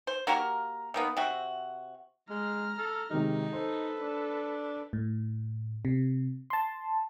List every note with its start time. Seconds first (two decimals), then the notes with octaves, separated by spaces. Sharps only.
0.07 C5
0.27 A#3 F#4 G4 A#4
0.94 D#3 A#3 B3
1.17 C3 C4 F#4
2.30 G#3 A#5 F6
2.78 A4
3.10 C3 D#3 G#3 D#4
3.53 A4 B4 C5
4.00 D4
4.93 A2
5.85 C3
6.50 A5 C6